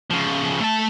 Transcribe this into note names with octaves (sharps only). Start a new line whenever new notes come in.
C#3 F3
A3 A5